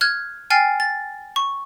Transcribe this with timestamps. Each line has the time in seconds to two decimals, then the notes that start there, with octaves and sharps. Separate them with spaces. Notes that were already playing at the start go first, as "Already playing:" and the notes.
0.01 F6 F#6 G#6
0.50 G5 G#5 F6 A6 C7
0.80 A6
1.36 C#6